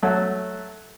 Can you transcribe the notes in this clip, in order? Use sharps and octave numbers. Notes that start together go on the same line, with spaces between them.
F#3 A3